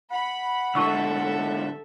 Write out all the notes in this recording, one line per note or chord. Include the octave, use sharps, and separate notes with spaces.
F#5 B5
G#2 D3 A4 E5 A5 C#6 E6